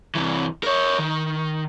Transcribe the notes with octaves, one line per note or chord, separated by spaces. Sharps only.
C3 E3
A#4 C#5
D#3